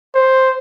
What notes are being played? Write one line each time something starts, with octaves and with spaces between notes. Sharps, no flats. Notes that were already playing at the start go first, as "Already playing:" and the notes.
C5